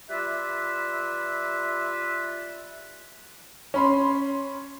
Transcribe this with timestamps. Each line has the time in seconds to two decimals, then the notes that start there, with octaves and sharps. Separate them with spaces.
0.09 G3 F4 B4 D5 E5
3.74 C#4 B5 C6